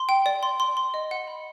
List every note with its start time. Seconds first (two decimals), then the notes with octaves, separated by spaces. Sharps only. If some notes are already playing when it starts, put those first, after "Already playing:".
Already playing: C6
0.09 G5
0.26 D5
0.43 C6
0.60 C6
0.77 C6
0.94 D#5
1.11 F#5
1.28 B5